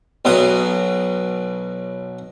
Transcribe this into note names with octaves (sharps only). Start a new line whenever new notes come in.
B1 B2 F#3 D#6